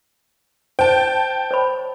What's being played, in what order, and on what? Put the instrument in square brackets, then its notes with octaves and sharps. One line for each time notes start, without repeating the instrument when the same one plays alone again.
[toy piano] C5 [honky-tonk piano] G5 A5
[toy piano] C5 C#5 B5